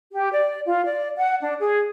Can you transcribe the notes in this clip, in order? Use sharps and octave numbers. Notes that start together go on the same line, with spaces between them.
G4
D5
F4
D5
F#5
D4
G#4